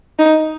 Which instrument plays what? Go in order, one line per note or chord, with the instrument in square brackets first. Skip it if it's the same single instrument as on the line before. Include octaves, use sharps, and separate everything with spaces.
[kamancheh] D#4